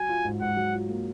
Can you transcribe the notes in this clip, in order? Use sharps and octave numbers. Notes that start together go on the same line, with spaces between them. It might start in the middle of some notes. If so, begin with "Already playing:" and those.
Already playing: F#3 G#5
F4
G#2
G#2 F#5
F#3
F4
A#3